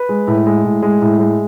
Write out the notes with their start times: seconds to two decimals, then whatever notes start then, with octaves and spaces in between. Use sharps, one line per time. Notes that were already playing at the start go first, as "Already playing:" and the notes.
Already playing: B4
0.09 G#3
0.27 A2
0.46 G#3
0.64 A2
0.82 G#3
1.01 A2
1.20 G#3